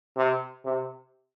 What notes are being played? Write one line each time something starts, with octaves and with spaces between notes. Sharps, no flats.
C3
C3